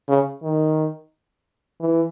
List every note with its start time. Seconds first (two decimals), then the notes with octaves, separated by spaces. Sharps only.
0.09 C#3
0.43 D#3
1.80 E3